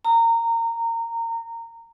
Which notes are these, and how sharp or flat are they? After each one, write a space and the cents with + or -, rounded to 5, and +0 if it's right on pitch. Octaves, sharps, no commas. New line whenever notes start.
A#5 -20